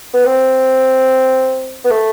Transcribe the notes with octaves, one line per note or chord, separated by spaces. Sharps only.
B3
C4
B3
A3